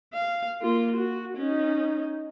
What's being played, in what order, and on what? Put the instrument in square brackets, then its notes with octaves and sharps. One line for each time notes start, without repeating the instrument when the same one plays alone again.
[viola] F5
A#3 F4
F#4
C#4 D#4